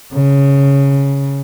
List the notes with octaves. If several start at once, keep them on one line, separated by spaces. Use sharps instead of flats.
C#3